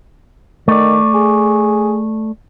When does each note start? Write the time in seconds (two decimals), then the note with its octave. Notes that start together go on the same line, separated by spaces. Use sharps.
0.68 D#3 A3 D5
1.14 G#4